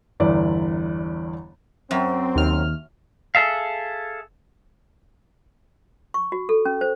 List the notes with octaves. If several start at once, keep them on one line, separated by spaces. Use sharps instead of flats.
G1 E2 E4 D5
F#2 C4
D#2 F6
G#4 A4 E5 F5
C#6
F#4
A4
C#4
C5